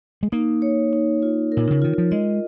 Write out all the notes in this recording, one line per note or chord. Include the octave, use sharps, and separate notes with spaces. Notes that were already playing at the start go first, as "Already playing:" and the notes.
G#3
A#3 D#4
C#5
D#4
F4
A#4
A#2
C#3
D#3 F4
F3
G#3 D#5